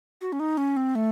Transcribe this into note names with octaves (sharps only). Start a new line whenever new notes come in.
F#4
C#4
D#4
C#4
C4
A3